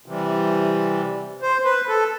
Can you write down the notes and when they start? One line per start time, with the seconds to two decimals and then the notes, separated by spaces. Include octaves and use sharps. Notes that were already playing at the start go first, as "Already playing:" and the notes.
0.06 C3 E3 G3
1.42 C5
1.65 B4
1.88 A4